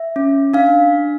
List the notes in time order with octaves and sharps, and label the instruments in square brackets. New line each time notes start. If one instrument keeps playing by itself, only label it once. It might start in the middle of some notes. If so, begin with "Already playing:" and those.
Already playing: [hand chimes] E5
C#4
D4 F5